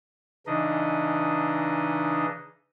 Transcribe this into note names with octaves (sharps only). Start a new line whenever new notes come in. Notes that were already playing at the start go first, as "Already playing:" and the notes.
C#3 E3 D4 D#4 D#5